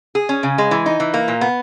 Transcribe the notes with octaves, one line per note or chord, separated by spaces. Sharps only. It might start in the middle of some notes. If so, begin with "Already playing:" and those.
G#4
C#4
C#3
G#3
E3
D#4
E3
A#3
A#2
B3